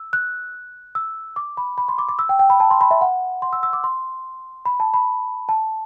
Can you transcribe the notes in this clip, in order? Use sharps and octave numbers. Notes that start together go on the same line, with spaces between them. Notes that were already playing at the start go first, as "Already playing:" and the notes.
Already playing: E6
F#6
E6
D6
B5
B5
C6
D6
D6
E6
G5
G5
B5
A5
C6
B5
E5
F#5
C6
E6
E6
D6
C6
B5
A5
B5
A5